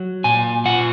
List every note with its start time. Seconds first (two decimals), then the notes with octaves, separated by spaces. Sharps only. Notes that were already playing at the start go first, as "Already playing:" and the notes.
Already playing: F#3
0.24 A#2 G#5
0.65 F4 F#5